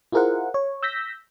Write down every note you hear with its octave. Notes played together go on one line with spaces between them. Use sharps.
E4 F4 G#4 A#4 C5 F#5
C#5
E6 G6 A#6 B6